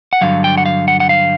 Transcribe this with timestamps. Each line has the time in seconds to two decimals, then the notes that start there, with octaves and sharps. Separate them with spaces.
0.13 F#5
0.21 G2 D3 F#3 F5
0.44 G5
0.58 F#5
0.66 F5
0.88 F#5
1.00 F#5
1.09 F5